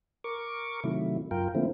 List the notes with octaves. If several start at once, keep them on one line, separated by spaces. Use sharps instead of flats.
A#4 C#6 D6
C3 D#3 F#3 A3 E4
F#2 F4 A#4 G5
D3 F3 A3 A#3 C4 E4